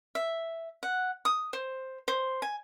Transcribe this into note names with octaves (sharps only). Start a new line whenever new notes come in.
E5
F#5
D#6
C5
C5
G#5